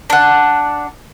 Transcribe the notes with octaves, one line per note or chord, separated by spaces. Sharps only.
D4 F#5